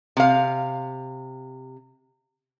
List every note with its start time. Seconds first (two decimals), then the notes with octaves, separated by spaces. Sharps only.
0.17 C3 F5